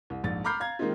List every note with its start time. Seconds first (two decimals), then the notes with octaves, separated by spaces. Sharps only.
0.10 C2
0.24 A#1 G#2 A6
0.44 A#5 B5 D6 F6 G6 C7
0.60 F5 A#5 G#6
0.79 D#3 G#3 A#3 C4 D#4 F4